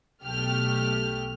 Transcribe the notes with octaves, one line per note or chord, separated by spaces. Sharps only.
B1 A3 G4 F6